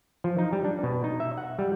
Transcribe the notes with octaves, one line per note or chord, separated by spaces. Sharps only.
F3
D#4
G3
D4
B2
D#4
E5
F#5
G3